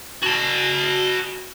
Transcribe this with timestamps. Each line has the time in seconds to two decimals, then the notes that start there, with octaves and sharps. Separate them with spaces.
0.23 F#4 A5